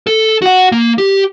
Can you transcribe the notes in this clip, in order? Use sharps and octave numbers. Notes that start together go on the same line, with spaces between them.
A4
F#4 F#5
A#3
G4